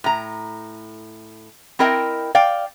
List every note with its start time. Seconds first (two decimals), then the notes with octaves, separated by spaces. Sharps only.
0.04 A2 A#5
1.79 C4 E4 A#4 D#5 G5
2.35 D5 F5 G5